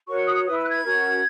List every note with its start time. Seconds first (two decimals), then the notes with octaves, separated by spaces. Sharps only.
0.08 F#4 A#4 C#5 C#6
0.26 D#6
0.45 E4 B4 D#6
0.58 E6
0.65 F#6
0.70 G#6
0.84 C#4 F#4 A#4